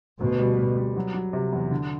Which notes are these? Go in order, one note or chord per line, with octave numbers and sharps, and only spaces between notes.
D2 B2
G3
G3
G3
F#3
F#3
C3
E2
D3